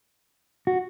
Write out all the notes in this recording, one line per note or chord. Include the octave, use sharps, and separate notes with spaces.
F#4